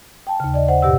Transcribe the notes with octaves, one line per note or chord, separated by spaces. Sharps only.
G5 A5
D#2 C#3
D5 D#5
C5 F#5
G2 B2 G4 F#5 E6